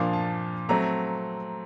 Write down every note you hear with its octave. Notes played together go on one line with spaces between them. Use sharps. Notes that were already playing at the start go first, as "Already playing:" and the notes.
Already playing: A#2 F3 A#3 D4 F5
A5
F#3 A3 C4 A#5